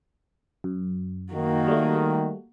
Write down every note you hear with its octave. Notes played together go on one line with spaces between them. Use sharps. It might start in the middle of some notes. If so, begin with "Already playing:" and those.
F#2
D#3 A#3 F#4
G3 A3